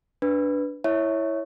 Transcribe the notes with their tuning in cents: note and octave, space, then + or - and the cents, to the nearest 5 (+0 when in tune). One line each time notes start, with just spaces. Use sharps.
D4 -10 B4 +0
E4 +0 C#5 +0 E5 -20